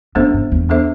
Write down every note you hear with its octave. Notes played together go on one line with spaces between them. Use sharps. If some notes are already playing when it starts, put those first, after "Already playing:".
F#2 B3 D4 A4 C5 E5
G2
E2
B3 D4 A4 C5 E5